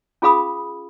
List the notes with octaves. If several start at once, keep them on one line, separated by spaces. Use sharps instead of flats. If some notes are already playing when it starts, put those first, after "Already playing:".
C#4 F4 G#4 F5 B5 D#6